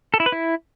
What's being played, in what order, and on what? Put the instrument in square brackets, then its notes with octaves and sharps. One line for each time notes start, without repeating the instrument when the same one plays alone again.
[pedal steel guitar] A4
E4
B4
E4